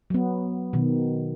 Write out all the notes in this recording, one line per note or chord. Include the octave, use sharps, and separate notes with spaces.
F#3 B3
B2 D#3